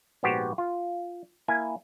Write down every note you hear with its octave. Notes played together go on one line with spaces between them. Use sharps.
A#1 G#2 B3 F#4 G4 C5
F4
A#3 E4 G#5 A#5